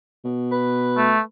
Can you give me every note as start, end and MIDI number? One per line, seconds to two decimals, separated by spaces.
0.25 1.14 47
0.51 1.21 71
0.97 1.20 57